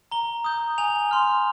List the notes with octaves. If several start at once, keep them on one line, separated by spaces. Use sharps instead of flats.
A#5 G7
D#6 G6
G#5 F7
C6 F6